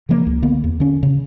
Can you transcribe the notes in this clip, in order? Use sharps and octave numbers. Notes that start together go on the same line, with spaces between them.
C#3 E3 F3 A#3
C#2
D3 A#3 B3
E2
D3 C#4
C#3